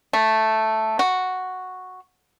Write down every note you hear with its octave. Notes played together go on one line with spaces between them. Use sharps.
A3
F#4